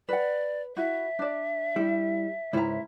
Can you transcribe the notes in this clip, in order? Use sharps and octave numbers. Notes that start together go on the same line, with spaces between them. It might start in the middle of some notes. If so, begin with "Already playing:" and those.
B4 D5 F#5
E4 F#4 E5
D4 D5
G3 E4
C#2 G#2 E4 A#5